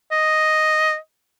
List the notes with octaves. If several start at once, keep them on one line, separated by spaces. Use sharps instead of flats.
D#5